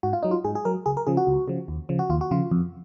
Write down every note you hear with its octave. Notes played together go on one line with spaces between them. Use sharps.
G#2 F#4
F4
F#3 D#4
F4
G#2 G#4
G#4
F#3 A#4
C#2 G#4
A#4
C#3 F3 G#4
F#4
C#2
C#3 F3
D#2
C#3 F3
F#4
D#2 F4
F#4
C#3 F3 F4
F2